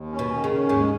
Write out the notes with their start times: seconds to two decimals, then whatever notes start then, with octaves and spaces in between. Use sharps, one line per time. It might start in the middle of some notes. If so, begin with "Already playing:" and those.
Already playing: D#2
0.12 C#4
0.19 B2
0.32 D#3
0.44 C#3
0.51 C#4
0.69 D#2 G#2 G#3